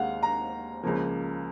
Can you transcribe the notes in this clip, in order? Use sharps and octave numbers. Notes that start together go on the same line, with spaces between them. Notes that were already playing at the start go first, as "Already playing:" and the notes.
Already playing: D#2 D#3 G#3 F5 F#5
A#5
C#2 C#3 F3 A#3